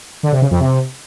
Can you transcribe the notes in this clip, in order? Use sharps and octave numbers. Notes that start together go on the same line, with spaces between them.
D3
C3
C#3
F2
C3